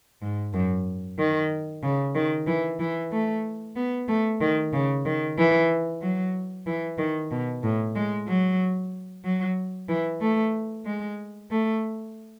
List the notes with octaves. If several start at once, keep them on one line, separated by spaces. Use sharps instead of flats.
G#2
F#2
D#3
C#3
D#3
E3
E3
A3
B3
A3
D#3
C#3
D#3
E3
F#3
E3
D#3
B2
A2
G#3
F#3
F#3
E3
A3
G#3
A3